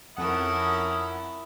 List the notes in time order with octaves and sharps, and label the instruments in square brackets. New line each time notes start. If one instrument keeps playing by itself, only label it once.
[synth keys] F2 F#5 [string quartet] C#4 A#4 A5 [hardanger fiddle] E4 [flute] D#6